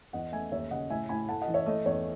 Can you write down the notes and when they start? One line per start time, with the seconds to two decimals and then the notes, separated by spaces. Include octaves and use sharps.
0.13 E2 D#5 F#5
0.32 A3 E5 G#5
0.52 D#2 C#5 E5
0.71 C#3 D#5 F#5
0.90 A2 E5 G#5
1.09 A2 G#5 B5
1.28 A3 F#5 A5
1.42 D#5 F#5
1.48 E3
1.54 C#5 E5
1.66 A3 D#5
1.86 E2 C#5